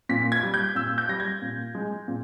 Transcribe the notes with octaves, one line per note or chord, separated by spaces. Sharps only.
A#2 B6
G#6
G3
G6
A#2 E6
G6
G3 A#6
G#6
A#2
G#3
A#2